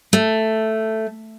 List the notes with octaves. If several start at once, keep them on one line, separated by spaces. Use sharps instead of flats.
A3